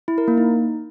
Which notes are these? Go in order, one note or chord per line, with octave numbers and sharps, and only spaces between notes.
E4
A#4
A#3
D#4